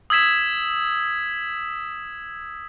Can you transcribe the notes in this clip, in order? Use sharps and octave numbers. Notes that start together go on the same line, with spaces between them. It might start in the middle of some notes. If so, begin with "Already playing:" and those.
D#6 E6 G#6 B6 E7